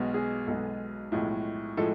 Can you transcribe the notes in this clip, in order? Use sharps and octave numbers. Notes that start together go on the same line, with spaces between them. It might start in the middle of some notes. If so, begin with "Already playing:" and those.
Already playing: B1 B2 G#3
G#4
B1 B2 G#3 A4
B1 A2 F3 G#3
A2 F3 G#3 A4